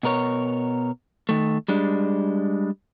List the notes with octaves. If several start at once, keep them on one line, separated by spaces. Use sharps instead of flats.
B2 B3 A#4 C#5
D#3 A3
G3 G#3 D4